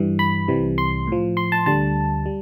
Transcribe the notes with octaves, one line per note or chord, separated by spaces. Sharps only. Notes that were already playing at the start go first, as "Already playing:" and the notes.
Already playing: G2 E3 G3
B5
C2 C3 E3 G3
C6
A2 F3
C6
A5
D2 D3 G3 A5
G3